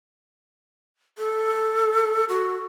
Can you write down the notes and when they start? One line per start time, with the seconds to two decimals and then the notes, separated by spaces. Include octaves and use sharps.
1.18 A4
2.29 F#4